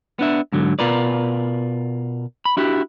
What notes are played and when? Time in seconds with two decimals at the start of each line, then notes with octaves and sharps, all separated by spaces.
0.19 B3 D4 E5
0.53 G#2 D3 F#3
0.79 B2 F4 A#4 B4 D5
2.45 B5
2.57 D4 E4 F#4 G4